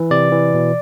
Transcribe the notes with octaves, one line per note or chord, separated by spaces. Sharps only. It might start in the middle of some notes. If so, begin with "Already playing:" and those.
Already playing: E3
C3 D5
E3
B2